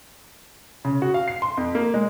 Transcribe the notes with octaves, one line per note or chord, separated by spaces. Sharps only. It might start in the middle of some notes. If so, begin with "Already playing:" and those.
C#3
F#4
F5
C7
C6
F2
A#3
G#3